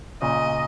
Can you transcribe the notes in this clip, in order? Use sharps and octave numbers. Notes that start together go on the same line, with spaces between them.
A#2 C#3 D#5